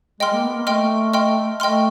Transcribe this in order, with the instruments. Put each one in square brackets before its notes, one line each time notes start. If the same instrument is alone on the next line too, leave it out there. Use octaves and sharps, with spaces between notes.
[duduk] G#3 [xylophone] D#5 G5 C6 F6
[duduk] A#3
B3
A#3
[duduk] A3 [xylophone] D#5 G5 C6 F6
[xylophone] D#5 G5 C6 F6
[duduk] A3 [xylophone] D#5 G5 C6 F6